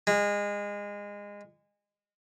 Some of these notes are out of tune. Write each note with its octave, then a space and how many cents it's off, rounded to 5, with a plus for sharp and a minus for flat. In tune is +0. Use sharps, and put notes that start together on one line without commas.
G#3 -25